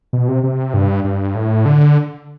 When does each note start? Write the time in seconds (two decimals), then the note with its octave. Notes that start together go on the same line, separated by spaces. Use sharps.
0.13 B2
0.28 C3
0.43 C3
0.74 G2
1.04 G2
1.35 A2
1.66 D3